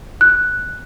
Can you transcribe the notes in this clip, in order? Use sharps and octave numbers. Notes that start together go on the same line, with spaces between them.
F#6